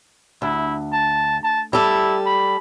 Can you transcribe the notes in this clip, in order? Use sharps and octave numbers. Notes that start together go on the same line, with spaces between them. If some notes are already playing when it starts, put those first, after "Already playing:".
D2 E4
A5
A5
G3 E4 A4
B5